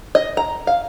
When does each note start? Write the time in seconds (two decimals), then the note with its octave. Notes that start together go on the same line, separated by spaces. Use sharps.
0.15 D#5
0.37 A#5
0.67 F5